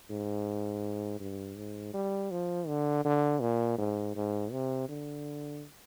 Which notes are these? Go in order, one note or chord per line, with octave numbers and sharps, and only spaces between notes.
G#2
G2
G#2
G3
F3
D3
D3
A#2
G#2
G#2
C3
D3